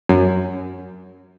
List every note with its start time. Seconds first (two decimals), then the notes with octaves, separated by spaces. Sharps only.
0.09 F#2